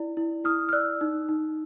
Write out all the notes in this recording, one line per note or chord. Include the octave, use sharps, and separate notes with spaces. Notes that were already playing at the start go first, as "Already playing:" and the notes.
Already playing: E4 D5
E4
E4 D#6 F6
F6
D5 E6 F#6
D#4
D#4